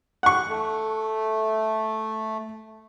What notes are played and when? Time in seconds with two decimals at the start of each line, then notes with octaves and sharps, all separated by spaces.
0.23 F#5 C#6
0.49 A3